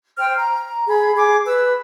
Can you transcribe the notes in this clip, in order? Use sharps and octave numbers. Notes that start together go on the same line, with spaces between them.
C5 G5 F6
A#5
G#4 B5
G#4 D6
B4 E6